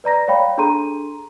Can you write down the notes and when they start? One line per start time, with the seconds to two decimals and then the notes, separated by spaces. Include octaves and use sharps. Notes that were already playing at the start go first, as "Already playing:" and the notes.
0.04 B4 D5 A#5 A#6
0.28 C#5 F5 G5 B5
0.58 D4 G#4 A4 A#5 C6 D#7